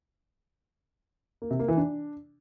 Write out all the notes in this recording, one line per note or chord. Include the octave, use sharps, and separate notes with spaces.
A#3
C3
A#3
E3
D4